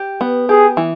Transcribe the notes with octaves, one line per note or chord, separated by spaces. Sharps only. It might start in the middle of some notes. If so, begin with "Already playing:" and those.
Already playing: G4
B3
G4 G#4
E3